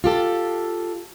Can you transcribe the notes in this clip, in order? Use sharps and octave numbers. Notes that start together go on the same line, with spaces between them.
F4 G4 A4